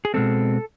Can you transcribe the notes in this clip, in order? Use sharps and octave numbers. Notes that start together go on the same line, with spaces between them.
G#4
B2 G#3 C4 A4